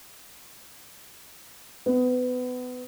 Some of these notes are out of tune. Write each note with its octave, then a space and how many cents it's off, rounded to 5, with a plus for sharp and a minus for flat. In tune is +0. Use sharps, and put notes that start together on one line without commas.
B3 +25